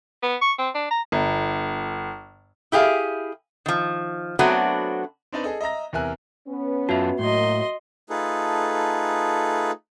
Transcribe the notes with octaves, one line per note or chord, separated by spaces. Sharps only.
B3
C#6
C4
D4
A#5
G1
E4 G4 G#4 F5
D#3 F3
F#3 A3 B3 C4 D4 F#4
C4 D4 D#4 B4 D5
G#4 A4 D#5
D#5 E5 A#5 A#6
E2 C3 A#4 E5 G#5 F#6
B3 C#4
F#2 F4 F#4 E5 A5
A2 F#3 A#3 D#5 C6
A3 D#4 F4 G#4 A4 B4